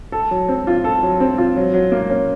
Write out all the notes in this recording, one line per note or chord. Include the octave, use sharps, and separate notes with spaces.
A4
F#3
C4
F4
A4
F#3
C4
F4
F#3
F#3
A#3
C#4